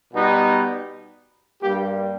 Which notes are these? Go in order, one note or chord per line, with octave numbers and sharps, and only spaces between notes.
B2 G3 B3 D#4
G2 G3 A#3 G4